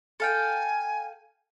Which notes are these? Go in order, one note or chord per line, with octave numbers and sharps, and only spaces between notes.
A4 F5 G5 G#5